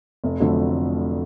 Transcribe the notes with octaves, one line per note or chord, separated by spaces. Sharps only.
F1
F2 D3 F#3 A3